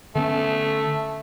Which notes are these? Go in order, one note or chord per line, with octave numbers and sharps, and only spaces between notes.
D3 A3 B3 C#4